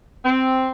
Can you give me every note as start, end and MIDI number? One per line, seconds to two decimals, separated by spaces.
0.25 0.72 60